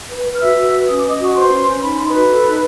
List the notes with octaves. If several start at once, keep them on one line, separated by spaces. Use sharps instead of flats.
B4
B4
F6
F#4 E5 E6
F#4
B4
C#4 D#6
D6
C#4 D#5 D#6
F#4 C#6
B4 C5 C6
C#4
C#4
D#4 B5
D#4 C6
B4 B5
F#4
A4
D#4